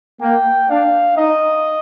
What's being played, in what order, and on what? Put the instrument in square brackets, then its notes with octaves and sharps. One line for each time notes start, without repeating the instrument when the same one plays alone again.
[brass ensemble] A#3 [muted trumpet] G5
[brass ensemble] D4 [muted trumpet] F5
[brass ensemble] D#4 [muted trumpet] D#5